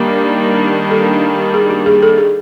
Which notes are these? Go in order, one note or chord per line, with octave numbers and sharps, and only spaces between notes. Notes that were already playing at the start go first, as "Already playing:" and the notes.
Already playing: D#3 G3 A#3 D4
A4
G#4
G4
G#4
A4
G#4